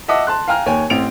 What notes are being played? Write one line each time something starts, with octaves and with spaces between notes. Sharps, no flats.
D#5 E5 F#5 A5 D6 E6
A5 C6 F#6
F5 G5 G#5 A#5 F6
D#2 C#5 G5 G#5
A1 C4 D7 F7